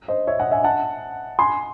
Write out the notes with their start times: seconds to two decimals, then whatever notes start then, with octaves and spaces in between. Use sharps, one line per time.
0.08 C5 D#5
0.27 C#5 E5
0.39 D#5 F#5
0.51 E5 G#5
0.64 F#5 A5
1.39 G#5 C6